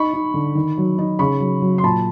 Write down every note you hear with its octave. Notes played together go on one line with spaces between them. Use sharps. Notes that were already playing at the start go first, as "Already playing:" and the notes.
Already playing: D#4 B5 C#6
D#4
D3
D#3
F#3
D#4
C#3 B5 C#6
F#3
F#3
C6
A#2 A5 B5